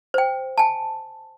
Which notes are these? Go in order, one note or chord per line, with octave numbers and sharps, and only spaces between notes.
C5 G5
G#5 A5